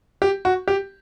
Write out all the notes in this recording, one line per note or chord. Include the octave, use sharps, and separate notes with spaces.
G4
F#4
G4